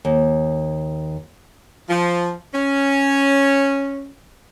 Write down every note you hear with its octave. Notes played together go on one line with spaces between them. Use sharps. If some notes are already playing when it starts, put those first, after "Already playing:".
D#2
F3
C#4